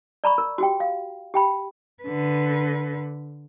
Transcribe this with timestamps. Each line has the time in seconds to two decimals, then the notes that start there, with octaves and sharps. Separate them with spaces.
0.24 D5 A#5 B5 C#6
0.38 A#4
0.58 F#4 G4 G5
0.80 F5
1.34 G4 G5 B5
2.04 D3 B4